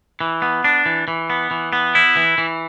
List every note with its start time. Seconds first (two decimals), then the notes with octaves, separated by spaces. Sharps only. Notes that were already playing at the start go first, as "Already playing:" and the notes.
0.21 E3
0.42 B3
0.64 D4
0.86 E3
1.08 E3
1.30 B3
1.51 E3
1.73 B3
1.95 E4
2.17 E3
2.38 E3